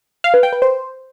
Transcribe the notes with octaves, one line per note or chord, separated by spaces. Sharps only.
F5
B4
G5
B4
C5